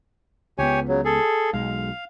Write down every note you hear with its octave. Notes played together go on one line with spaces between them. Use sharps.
C#2 B3 G4 C#5 G#5
C#3 F#3
G#4 A4
B1 G#3 F5